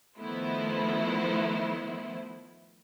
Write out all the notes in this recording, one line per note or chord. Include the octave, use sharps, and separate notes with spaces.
D#3 F3 A3 B3 E4 C5